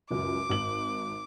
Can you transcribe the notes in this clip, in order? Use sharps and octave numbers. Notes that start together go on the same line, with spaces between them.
C#2 F#2 D6
G#1 F#7